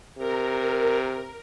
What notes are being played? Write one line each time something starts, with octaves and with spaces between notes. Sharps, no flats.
C3 A#4